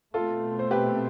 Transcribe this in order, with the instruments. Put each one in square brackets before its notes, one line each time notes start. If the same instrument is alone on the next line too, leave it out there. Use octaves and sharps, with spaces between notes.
[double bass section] B2 A3 C4 [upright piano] F4 A4
[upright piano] C5
G4 B4